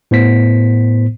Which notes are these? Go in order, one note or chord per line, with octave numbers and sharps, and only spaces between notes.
A2 B3 C5 B6